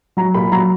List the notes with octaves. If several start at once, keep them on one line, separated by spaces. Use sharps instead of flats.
F#3 A#5
A#2 B5
F#3 A#5